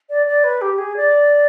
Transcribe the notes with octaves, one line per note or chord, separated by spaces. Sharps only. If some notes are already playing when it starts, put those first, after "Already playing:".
D5
D5
B4
G4
G#4
D5